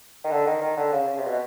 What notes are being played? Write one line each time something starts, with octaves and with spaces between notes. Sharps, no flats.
D#3
D3
D#3
D#3
D3
C#3
C#3
C3
B2